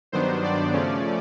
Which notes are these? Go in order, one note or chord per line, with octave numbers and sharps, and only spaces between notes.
G2 D#3 F#3 B3 D4 C5
D5
C#3 F3 A3 C#4